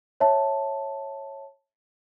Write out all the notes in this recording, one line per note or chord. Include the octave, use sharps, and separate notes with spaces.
C#5 E5 A5